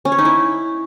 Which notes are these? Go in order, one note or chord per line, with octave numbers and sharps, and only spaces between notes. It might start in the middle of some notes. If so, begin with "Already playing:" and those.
C#4
C#5
D#4
E4